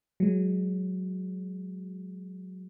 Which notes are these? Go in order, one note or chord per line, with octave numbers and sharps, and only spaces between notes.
F#3 G#3